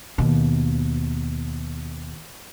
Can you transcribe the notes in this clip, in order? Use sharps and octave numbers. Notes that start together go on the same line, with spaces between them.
D#2 B2